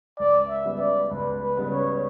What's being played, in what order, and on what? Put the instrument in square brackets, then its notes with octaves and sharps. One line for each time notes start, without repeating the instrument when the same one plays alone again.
[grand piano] C#2 [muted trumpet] D5
[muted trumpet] E5
[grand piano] C#3 G3 B3
[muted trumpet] D5
[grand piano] C#2 [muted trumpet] B4
[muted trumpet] B4
[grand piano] C#3 G3 B3
[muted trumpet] C#5